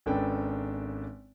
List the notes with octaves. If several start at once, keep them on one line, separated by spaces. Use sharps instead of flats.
G#1 C#4 D4 A4 B4 G5